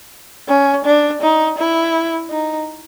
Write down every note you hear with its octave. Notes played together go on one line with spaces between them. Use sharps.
C#4
D4
D#4
E4
D#4